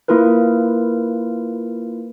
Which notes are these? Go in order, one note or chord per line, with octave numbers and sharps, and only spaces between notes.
A#3 E4 F4 A#4 B4